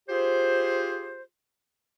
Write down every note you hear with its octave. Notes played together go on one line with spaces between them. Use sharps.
F4 G4 G#4 C5